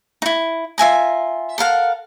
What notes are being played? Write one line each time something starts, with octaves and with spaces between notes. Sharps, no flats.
D#4 E4
F4 E5 G#5 A#5
A4 A#4 F5 F#5